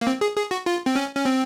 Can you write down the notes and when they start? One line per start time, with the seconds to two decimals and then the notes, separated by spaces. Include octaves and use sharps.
0.01 A#3
0.07 C4
0.21 G#4
0.37 G#4
0.51 F#4
0.66 F4
0.86 C4
0.96 C#4
1.16 C#4
1.25 C4